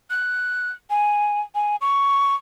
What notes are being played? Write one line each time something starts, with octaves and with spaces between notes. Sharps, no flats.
F#6
G#5
G#5
C#6